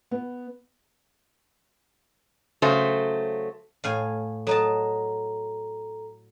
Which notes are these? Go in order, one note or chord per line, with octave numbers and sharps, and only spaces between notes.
B3
C#3 F#3 A3 C5
A2 F5 G#5
F#3 A4 D#5 A5 A#5